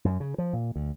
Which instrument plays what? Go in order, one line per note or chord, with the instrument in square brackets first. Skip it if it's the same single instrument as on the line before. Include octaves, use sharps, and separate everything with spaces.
[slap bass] F#2
C#3
F3
A#2
D2